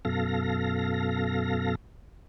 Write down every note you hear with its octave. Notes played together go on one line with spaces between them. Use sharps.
F#2 B2 A4 F5 A#6